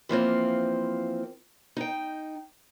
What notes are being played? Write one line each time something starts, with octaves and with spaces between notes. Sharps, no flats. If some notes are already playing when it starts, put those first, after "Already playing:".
E3 F3 A#3 C4
D#4 G5